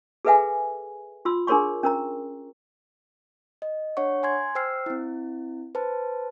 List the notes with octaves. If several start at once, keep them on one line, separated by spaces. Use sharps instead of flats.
G#4 A4 B4 E5 F#5 G#5
F4 C6 E6
D4 G#4 A#4 C#5 C6 C#6
C#4 A#4 A#5
D#5
D4 C#5 F#5 C#6
G#5 C6 G#6
C5 G5 E6 F6 C7
C4 E4
B4 C5 A5